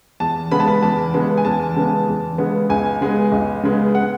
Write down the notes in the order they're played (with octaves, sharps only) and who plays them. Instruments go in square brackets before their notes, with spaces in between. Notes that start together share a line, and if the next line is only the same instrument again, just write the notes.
[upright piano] E2 A5
C#3 G#3 B3 B5
A5
B5
E2 A5
C#3 G#3 B3
G#5
E2 A5
C#3 G#3 B3
E2
C#3 G#3 B3
C#2 G#5
C#3 G#3 B3
C#2
C#3 G#3 B3
F#5